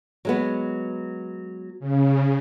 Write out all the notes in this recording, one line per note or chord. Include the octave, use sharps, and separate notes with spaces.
F#3 G#3 B3
C#3